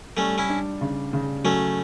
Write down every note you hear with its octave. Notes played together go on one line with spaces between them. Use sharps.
G3 A3 C#4
C#4 E4
D4
C#3
C#3
F#3 A3 C#4